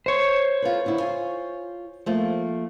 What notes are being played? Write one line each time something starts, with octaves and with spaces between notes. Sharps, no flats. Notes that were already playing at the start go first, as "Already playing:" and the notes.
C5 C#5
F4 A4 B4
D3 E4
F4 G#5
F3 A3 A#3